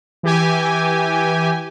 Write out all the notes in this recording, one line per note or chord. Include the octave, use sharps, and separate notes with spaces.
E3 G4 G#5